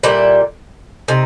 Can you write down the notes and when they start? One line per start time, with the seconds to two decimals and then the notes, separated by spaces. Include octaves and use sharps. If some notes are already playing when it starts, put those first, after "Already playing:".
0.03 A#2 G3 E4
1.08 C3 D#4